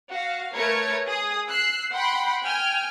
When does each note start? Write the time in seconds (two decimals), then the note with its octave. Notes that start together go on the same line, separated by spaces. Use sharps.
0.11 F#4 F5
0.55 A3 A#4 B4 C#5 G#6 C#7
1.07 G#4 D#6
1.48 E6 F#6 C7
1.92 F#5 G5 B5 C6
2.43 G5 G#5 F6